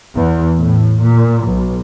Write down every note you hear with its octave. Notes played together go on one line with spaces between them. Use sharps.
E2
A2
A#2
B1